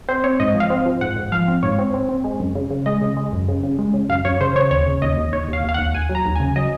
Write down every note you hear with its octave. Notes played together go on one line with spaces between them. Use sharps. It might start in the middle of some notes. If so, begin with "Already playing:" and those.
C4 C5
C4 C#5
G#2 D#5
F3
F5
C4
F3
G#2 F#5
G#2
F3 F5
C4
G#2 C#5
C4
C4
C4
G#3
F#2
C#3
C#3
G#3 D#5
C#3
G#3
F#2
C#3
C#3
G#3
C#3
F#2 F5
F#2 C#5
C#3 C5
C#3 C#5
D#2 C#5
C#3
D#2 D#5
D#2
D#2 C#5
D#2 F5
D#2 F5
D#2 F#5
D#2 G#5
F#3
A#5
D#2
C#3 G#5
F#3 D#5